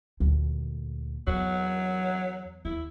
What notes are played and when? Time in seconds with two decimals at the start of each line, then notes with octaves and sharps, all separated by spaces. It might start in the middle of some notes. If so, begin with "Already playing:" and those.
0.20 D2 A#2
1.27 E2 F#3
2.65 D#2 E4